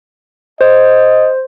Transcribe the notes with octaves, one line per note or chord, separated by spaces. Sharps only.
C5 D#5